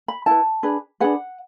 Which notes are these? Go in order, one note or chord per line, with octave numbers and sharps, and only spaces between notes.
B5
E4 B4 A5
D4 G#4 B4
D4 G#4 B4 F#5